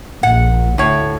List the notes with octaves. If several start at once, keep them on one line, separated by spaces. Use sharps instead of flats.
A#1 F#5
D2 A2 C#5